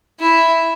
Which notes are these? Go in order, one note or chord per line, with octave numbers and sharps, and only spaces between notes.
E4